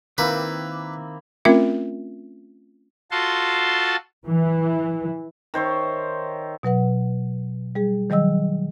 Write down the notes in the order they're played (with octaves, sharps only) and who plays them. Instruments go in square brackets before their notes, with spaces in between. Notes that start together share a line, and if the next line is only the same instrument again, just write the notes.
[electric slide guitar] D#3 C4 [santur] A#3 E4 [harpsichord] B4
[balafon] A3 C4 C#4 F4 A#4 E5
[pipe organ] F4 F#4 A4 A5 C6
[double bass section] E3
[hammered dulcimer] D#3 C5 C#5 E5
[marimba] B2 F#3 B4 F#5
G3 G#4
D#3 F#3 G3 D#5 E6